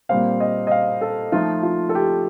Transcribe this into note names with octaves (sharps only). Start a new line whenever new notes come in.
A#2 G3 C4 F5
D#5
D#5
F5
A4
F3 A3 D#4 F4
F4
A4
G4